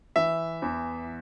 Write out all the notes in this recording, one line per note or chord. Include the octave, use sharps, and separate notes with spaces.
E3 E5
E2